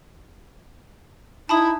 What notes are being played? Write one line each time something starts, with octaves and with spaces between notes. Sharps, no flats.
D#4 E4 A5 B5 D#6